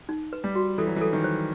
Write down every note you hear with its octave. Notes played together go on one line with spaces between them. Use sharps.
D#4
B4
G3
F#4
E3 A4
F#3
E3
A4
D#3
C5